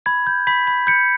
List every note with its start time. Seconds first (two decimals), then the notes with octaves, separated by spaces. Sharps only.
0.06 B5 G#6
0.27 G6
0.47 B5 B6
0.67 B5
0.87 G6 C#7